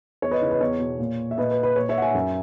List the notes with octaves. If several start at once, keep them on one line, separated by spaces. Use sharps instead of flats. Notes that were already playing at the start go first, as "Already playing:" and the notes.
E2 C#5
B4 D#5
C#3 E3
B4 D#5
E2 C#5
B2
A#2
E5
A#2 B4 D#5
B4
B4
A#2 C#5
C#5 E5
F#5
E5 G#5
F#2